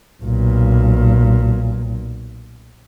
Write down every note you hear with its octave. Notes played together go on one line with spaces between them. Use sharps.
B1 A#2